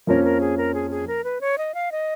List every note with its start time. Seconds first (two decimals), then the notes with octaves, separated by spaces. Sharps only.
0.07 F2 F3 A#3 C#4 A#4
0.24 A#4
0.41 G#4
0.58 A#4
0.74 G#4
0.91 G#4
1.08 A#4
1.24 B4
1.41 C#5
1.58 D#5
1.74 F5
1.92 D#5